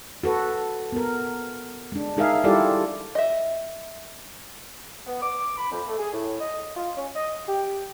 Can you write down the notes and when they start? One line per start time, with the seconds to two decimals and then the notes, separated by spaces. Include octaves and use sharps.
0.24 F#4 A4 B4
0.92 B3 A#4
1.92 G#3 D4
2.17 G#3 D#4 G#4 A#4 E5 F5
2.44 G3 E4 F4 G4 A4 D5
3.15 D#5 E5
5.07 B3
5.22 D6
5.58 B5
5.72 F2
5.87 A3
5.99 G#4
6.13 A2
6.40 D#5
6.76 F4
6.97 C#4
7.15 D#5
7.48 G4